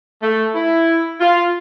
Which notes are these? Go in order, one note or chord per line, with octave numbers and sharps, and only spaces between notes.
A3
E4
F4